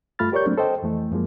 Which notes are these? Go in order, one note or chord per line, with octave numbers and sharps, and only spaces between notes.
G2 A3 F4 B5 F6 A6
G4 A#4 C#5 D5 C#6 G6
F#3 A3 A#3 C4 D4
A4 C5 D#5 G5
F2 E3 A3
F#2 F3 G#3 A#3